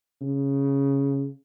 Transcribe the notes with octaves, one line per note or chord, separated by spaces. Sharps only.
C#3